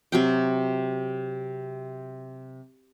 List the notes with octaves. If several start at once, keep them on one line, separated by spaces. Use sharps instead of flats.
C3 F#3 G5